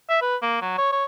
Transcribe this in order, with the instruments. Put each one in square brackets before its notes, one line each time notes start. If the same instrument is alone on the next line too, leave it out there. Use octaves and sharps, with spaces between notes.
[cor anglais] E5
B4
A#3
F#3
C#5
C#5